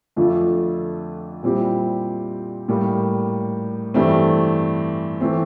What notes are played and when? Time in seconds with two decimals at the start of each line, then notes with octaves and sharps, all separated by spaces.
0.16 F2 D3 A3 D4 F4
1.43 A#2 G3 C4 E4 G4
2.68 A2 G3 A#3
3.94 G2 E3 A3 C4
5.21 E3 A3 C4